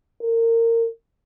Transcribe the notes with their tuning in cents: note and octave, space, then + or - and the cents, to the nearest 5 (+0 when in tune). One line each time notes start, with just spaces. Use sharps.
A#4 -25